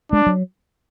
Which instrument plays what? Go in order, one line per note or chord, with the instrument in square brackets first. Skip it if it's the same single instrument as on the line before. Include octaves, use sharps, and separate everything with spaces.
[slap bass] G#3 [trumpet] D4
[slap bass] F#3